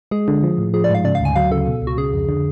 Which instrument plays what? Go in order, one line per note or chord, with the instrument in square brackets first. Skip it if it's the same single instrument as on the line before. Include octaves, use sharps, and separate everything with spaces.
[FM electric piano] G#3 [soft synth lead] G#4
[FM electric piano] D3
F3
A2
[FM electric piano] F3 [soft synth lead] G#4
[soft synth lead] D5
[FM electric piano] G#2
[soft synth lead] F5
[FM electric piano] C#3 [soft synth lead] D5
[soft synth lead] F5
[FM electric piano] D2 [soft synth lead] G#5
[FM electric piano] F#3 [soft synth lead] F5
[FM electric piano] C#3 [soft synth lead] A4
[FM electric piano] B2
C#2
[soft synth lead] F#4
[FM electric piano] C#3 [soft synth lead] G#4
[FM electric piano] F2
D3